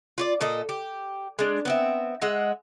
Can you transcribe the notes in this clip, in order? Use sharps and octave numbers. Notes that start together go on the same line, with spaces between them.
F4 C#5 D5
A#2 A4 D#5
G4
G#3 D4
B3 C4 E5
G#3 D#5 E5 F#5